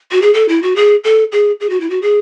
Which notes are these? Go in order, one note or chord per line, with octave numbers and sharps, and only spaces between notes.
F#4
G#4
A4
E4
F#4
G#4
A4
G#4
G#4
F#4
E4
F#4
G#4